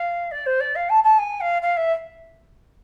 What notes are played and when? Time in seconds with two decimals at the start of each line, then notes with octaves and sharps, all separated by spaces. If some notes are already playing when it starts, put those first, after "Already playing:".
Already playing: F5
0.31 D5
0.46 C5
0.60 D5
0.75 F5
0.89 A5
1.04 A5
1.18 G#5
1.40 F5
1.62 F5
1.77 E5